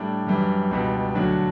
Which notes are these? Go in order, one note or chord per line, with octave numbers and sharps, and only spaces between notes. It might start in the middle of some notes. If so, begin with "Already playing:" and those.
Already playing: A2 G3 D4
F#2 E3 G3
C#2 B2 G3
D2 D3 F#3 D4